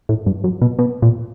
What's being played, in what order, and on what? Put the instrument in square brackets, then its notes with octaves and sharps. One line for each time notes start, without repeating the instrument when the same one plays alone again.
[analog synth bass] A2
G2
F#2
B2
B2
A#2